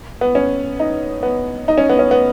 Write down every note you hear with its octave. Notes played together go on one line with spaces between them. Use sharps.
B3
C#4
D#4
B3
D#4
C#4
B3
C#4
B3